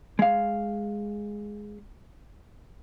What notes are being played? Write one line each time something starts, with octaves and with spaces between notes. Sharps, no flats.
G#3 F5